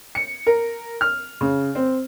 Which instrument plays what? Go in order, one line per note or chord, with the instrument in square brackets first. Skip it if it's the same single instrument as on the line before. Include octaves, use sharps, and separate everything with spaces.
[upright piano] C#7
A#4
F6
C#3
C4